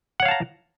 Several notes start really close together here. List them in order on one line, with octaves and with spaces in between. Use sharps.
F#5 C#5 F5 A5 A#5